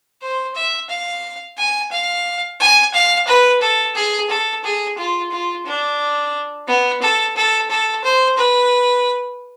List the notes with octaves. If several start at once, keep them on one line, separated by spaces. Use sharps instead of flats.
C5
E5
F5
G#5
F5
G#5
F5
B4
A4
G#4
A4
G#4
F4
F4
D4
B3
A4
A4
A4
C5
B4